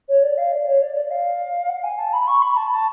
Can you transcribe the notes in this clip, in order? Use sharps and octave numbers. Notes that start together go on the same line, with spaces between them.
C#5
D5
F5
D5
C#5
D5
D5
F5
F#5
G#5
A5
B5
C#6
B5
A5
A5